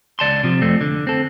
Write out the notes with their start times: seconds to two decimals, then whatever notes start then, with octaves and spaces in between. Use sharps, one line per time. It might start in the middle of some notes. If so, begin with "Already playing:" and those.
0.19 C#2 D5 A5 C6
0.44 C3 F3
0.62 F2 A3 C4
0.81 D3
1.07 C4 A4